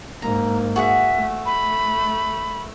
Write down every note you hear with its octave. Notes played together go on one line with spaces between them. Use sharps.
G#2 A#3 A#5
F#4 G#4 E5 F#5
A3
B5